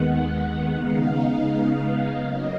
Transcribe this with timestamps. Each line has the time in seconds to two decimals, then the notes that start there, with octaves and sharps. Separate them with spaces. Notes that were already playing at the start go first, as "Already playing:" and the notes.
Already playing: D#2 D#3 G#3 B3 F#5
0.73 C#3 G#3 B3 D#4 F5
2.16 C#3 F#3 A#3 D#5